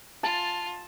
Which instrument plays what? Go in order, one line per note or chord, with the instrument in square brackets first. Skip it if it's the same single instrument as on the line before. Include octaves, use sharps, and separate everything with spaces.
[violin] F4 [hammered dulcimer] A5